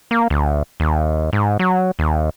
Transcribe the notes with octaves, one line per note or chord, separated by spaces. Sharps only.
A#3
D2
D#2
G#2
F#3
D#2